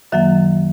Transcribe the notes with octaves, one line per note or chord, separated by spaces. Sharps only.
F#2 D#3 F#3 A#3 E5